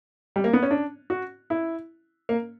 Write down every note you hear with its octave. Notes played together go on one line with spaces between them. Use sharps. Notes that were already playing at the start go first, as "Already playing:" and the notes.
G3
A#3
B3
C#4
D4
F#4
E4
A#3